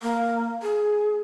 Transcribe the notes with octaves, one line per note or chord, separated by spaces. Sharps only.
A#3
G#4